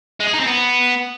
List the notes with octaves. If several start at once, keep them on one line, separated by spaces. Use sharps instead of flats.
G#3
G#4
D#4
C4
B3